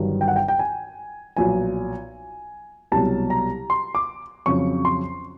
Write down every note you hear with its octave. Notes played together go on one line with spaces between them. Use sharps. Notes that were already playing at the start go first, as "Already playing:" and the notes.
Already playing: G1 G2 D#3 F#3
G5
F#5
G5
G5
G#5
B1 A#2 F3 G#5
C2 B2 F#3 A5
A#5
C6
D6
F2 C#3 F#3 C#6
C6